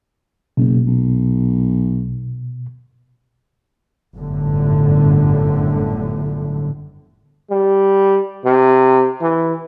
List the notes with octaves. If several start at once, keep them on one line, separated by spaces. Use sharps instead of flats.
F#1 B2
B1
G1 F#2 A2 D3
G3
C3
E3